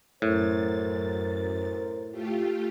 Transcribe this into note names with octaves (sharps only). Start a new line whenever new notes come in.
F#2 A2 A#4 C5 A6
A3 F4 G4